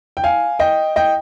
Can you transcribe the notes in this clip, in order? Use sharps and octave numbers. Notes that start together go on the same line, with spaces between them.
G5
F5 G#5
D#5 G5
D#5 G5